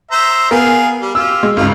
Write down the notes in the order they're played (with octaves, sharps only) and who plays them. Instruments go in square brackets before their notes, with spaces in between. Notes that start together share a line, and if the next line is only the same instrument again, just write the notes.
[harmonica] C5 E5 A#5
[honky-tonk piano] B3 A#4 [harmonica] G#4 F5
[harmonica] G3
[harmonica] F4 G4 [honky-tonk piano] E6
[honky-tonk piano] G#3
[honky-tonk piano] G#1 C#2 [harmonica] F4